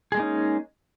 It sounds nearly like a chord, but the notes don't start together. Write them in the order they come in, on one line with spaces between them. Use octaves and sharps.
G#4 G#3 A#3 D#4 C#4